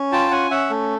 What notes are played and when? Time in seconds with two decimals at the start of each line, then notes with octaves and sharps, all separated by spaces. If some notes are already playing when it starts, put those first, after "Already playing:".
Already playing: C#4
0.12 F4 G5 A5
0.31 C#4 F#5 G#5
0.51 C#4 E5 F#5
0.70 A3